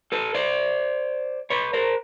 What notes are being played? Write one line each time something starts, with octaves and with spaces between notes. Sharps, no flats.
A4 B4
C5 D5
B4 C#5
A#4 C5